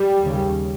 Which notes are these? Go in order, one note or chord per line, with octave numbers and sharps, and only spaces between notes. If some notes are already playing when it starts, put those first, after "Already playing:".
Already playing: G3
D#2 C#3